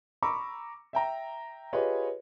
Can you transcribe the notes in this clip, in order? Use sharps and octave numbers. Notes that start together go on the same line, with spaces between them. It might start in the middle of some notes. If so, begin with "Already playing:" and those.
A#5 B5 C#6 D6 E6
E5 G5 A#5
F4 G4 G#4 B4 C#5 D#5